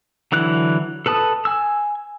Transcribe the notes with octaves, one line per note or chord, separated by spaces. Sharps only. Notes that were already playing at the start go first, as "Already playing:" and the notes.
D3 E3 F#3 F#6
A4 B4 A5 D#6
G#5 E6